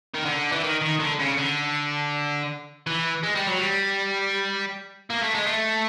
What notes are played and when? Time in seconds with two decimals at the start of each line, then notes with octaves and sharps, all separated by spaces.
0.15 D#3
0.25 D3
0.52 E3
0.63 D#3
0.82 D#3
1.00 D3
1.19 C#3
1.37 D3
2.87 E3
3.23 G#3
3.35 G3
3.47 F#3
3.58 G3
5.10 A#3
5.22 A3
5.35 G#3
5.47 A3